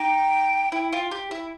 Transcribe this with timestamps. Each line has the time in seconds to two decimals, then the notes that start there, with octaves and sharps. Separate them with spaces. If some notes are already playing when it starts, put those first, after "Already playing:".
Already playing: D#4 G5
0.72 E4
0.93 F4
1.11 G4
1.31 E4